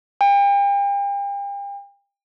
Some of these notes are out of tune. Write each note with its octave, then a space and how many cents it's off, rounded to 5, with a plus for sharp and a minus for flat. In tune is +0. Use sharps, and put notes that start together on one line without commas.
G5 +40